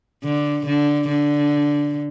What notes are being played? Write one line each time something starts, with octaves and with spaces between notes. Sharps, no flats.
D3
D3
D3